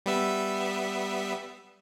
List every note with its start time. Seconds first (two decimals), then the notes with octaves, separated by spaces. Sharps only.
0.06 G3 B3 E5